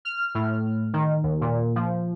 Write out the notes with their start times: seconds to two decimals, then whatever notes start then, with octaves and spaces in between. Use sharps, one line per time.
0.05 F6
0.35 A2
0.93 D#3
1.23 D#2
1.41 A#2
1.76 F3